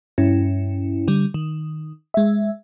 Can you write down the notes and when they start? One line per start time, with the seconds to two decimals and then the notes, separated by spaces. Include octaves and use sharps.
0.18 G2 C#4 E4
1.08 D3 G3
1.34 D#3
2.14 G#3 E5